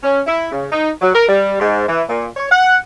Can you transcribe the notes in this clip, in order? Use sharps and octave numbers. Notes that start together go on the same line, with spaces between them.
C#4
E4
C#3
D#4
F#3
A#4
G3
G#2
E3
A#2
C#5
F#5